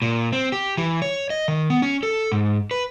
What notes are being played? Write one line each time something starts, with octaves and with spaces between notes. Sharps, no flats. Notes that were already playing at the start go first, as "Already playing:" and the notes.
A#2
C4
G4
E3
C#5
D#5
D#3
B3
C#4
A4
G#2
B4